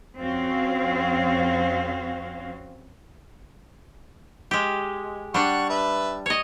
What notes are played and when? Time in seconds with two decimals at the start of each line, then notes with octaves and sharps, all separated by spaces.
0.18 F2 C4 C#4 F#4 F5
4.51 G#3 G4
5.34 G3 D4 F#5 C#6
5.70 B4 E5
6.26 C#5 D#5